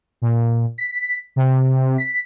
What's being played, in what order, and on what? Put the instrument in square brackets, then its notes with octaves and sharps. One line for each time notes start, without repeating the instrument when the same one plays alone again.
[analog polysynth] A#2
B6
C3
B6